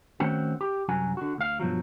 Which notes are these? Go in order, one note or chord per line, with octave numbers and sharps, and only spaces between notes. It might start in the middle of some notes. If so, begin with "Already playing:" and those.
D#3 A3 C4 C#4 F#4
G4
C2 F#2 F#3 F#4 G#5
D3 F#4
D2 F5
G2 B2 F3 F#3